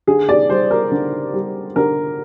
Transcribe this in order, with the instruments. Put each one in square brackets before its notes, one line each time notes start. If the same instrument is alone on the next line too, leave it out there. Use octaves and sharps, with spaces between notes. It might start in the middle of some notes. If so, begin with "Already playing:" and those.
[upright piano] D3 G#4
D5
G3 C5
A#4
D3
G3
D3 A#4